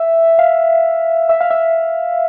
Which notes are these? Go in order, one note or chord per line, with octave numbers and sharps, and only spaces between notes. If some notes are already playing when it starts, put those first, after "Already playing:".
Already playing: E5
F5
E5
F5
E5